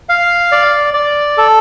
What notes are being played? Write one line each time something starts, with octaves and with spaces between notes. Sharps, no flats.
F5
D5
D5
A4